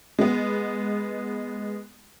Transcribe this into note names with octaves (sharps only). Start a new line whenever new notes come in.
G#3 B3